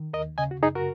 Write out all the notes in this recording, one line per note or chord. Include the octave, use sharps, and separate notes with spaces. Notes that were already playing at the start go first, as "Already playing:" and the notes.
Already playing: D#3
D#2 A#4 D#5
C#3 D#5 G#5
F#4
F#2 D#4 G#4
F#4 A#4